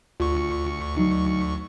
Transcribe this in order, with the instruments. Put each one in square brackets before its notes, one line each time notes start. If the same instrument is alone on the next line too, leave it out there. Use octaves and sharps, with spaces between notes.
[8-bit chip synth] D2 C#6 [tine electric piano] F4
[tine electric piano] F#3 D#4